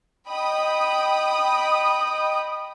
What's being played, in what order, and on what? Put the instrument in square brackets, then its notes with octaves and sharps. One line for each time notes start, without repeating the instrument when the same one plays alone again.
[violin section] D#5 G5 B5 D#6